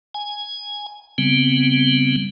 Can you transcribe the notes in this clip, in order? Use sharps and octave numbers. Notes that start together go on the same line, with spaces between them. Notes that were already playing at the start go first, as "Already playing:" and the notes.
G#5
C#3 G3 B3 C4